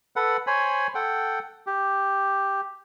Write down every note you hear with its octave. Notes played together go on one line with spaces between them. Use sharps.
A4 B4 F#5
C5 C#5 G#5 B5
A4 F#5 G5
G4